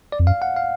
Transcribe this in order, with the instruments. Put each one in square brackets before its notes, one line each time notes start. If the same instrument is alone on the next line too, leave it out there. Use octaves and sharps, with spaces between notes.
[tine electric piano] D5
[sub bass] F2
[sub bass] F#2 [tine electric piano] F5
[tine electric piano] F#5
F5